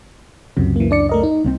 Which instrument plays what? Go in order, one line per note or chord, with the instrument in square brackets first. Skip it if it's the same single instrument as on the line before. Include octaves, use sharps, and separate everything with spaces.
[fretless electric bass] C#2 F#2 [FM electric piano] C3
[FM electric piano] E3 A#3
D4 D5 C#7
A3 A#4 D#5
D#4
[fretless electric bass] C2 F#3 C4